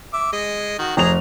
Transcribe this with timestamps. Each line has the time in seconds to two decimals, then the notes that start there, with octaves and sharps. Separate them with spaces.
0.13 E5 D6
0.33 G#3 D#5
0.79 D#3 F#4
0.97 F1 G#4 A#5 F7